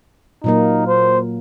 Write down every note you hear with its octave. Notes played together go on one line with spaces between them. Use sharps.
A#2 F#3 A#3 D#4
C5